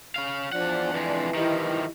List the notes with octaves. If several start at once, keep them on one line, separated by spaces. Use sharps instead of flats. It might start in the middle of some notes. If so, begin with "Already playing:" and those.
C#4 F5
E2 F3 D4 D5 F#5
F2 E3 G#3
D#3 F3 E4 G4 D#5